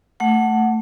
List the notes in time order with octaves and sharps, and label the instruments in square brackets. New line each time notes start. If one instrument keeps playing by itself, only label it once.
[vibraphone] A3 F#5